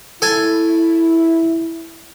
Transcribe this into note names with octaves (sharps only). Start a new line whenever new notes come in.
E4 A4 G#5